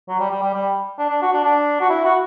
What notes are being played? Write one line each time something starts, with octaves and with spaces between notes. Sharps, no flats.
F#3
G3
G3
G3
G3
D4
D4
F#4
D4
D4
F#4
E4
F#4